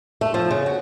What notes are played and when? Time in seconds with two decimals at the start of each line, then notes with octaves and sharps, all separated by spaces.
0.21 A3
0.34 F3
0.51 C#3
0.66 F#4